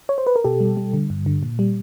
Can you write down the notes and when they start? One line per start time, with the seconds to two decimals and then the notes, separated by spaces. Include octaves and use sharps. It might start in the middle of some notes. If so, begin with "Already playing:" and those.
0.09 C#5
0.18 C5
0.27 B4
0.36 A#4
0.44 B2 G4 A4
0.60 G3
0.77 G3
0.93 D3
1.10 G2
1.26 D3
1.43 A#2
1.59 G3